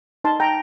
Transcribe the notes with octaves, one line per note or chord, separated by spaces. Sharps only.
D#4 A5 C6
G5 A#5